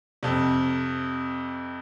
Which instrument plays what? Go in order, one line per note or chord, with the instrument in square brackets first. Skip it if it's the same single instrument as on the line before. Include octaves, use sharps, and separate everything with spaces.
[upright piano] F2 C3